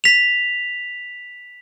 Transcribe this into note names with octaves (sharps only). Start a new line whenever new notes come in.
B6 F7